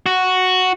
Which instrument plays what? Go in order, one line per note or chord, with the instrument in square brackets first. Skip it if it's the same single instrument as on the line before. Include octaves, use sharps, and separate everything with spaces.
[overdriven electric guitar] F#4